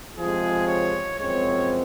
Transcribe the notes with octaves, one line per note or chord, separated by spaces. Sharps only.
F2 C3 F3 G#3 C4 G#4
C#5
F#2 F3 G#3 C4 C#5